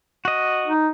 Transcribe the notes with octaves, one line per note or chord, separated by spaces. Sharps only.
F#4 D#5
D#4